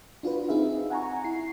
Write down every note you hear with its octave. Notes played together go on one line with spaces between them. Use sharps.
D4 F4 F#4 B4
C4 D#4 G#4 E5 F5
F#5 G#5 A#5 C#6
E4 C7